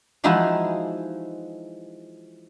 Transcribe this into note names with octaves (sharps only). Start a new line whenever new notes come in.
E3 F3 G#3 D#4 E4 F#4